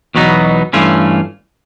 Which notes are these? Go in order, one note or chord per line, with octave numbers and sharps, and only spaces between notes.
E2 B2 F#3 B3 D#4
G2 E3 A3 C#4 F4